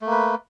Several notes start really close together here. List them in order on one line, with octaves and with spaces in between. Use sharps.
A3 A#3 B4